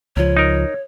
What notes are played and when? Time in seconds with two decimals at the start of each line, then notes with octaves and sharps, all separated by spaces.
0.17 C#2 F3 C#5
0.37 D#4 A#4